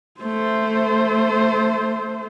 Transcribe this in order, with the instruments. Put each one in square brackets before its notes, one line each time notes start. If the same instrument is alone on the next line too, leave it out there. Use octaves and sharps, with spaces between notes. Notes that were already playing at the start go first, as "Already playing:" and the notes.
[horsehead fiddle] A3 C5